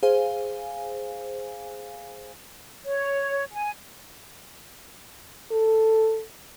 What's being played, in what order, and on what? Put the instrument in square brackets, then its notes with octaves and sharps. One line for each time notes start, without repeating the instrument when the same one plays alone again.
[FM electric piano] G#4 C5 F5 G#5
[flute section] C#5
G#5
[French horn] A4